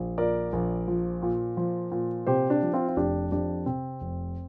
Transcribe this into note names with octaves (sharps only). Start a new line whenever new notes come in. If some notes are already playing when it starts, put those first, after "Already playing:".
Already playing: A#1
A#2 A#4 D5
A#1
F3
A#2
F3
A#2
C3 G4 C5
D4 G4
F3
C4 F4
F4
F1 D4 G4
F2 D4 G4
C3 C4
F1